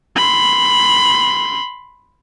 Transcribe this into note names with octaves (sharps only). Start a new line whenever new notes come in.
B5 C6